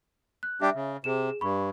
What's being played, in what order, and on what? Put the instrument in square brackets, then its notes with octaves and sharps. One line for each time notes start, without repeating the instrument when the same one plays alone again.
[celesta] F#6
[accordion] G3 D4 G4 [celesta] E5
[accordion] C#3
[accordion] C3 [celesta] G#4 E7
[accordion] G2 [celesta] B5 C#6